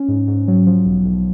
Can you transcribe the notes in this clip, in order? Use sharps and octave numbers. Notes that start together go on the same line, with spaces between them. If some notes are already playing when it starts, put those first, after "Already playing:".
Already playing: C#4
G#2
G#2
F#3
F3
B1
B1